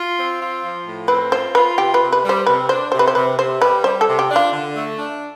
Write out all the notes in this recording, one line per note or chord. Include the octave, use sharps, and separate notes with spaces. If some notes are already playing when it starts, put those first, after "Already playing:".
Already playing: F4
C4
F4
F3
A2
C4 B4
F4 C5
F4 B4
C3 G4
B4
C3
B4
G3
C5
C3 B4
D4 C5
C3 C5
B4
C5
C3 B4
C3 C5
G3 B4
G3 C5
A4
C3
G4
D4
F4
D3
A3
D4